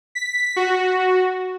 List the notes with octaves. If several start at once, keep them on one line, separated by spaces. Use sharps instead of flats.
B6
F#4